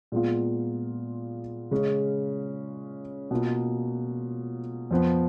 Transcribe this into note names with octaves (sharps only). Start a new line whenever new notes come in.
A#2 G#3 B3 F4
C#3 G#3 C#4
B2 A#3 F4
F2 F3 B3